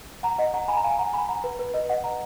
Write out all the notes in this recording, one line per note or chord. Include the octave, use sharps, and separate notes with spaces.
F#5 A#5
D#5 F#5
F#5 A#5
G#5 B5
A#5
F5 G#5
F#5 A#5
G#5 B5
F#5 A#5
B4
B4
B4 D#5
D#5 F#5
F#5 A#5